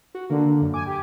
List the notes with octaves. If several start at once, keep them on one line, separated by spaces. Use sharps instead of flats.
F#4
D3 A#3
F#2
G#5 D6
G4